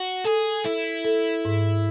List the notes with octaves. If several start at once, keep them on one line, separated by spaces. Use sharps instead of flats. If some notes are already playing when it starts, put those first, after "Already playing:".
Already playing: F#4
G#4 A4
E4 A4
A4
G#2